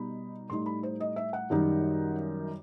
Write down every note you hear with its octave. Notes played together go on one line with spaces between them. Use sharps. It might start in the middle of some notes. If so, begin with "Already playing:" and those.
Already playing: B2 G3 D#4 B5
A2 G3 D#4 C6
B5
C5
D#5
E5
F#5
F#2 D#3 G3 D#4